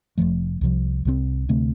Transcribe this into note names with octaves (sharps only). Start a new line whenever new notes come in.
F1 F2 F3 A3
C2 C3 F3
C2 C3 F3 C4
D2 C3 A3 C4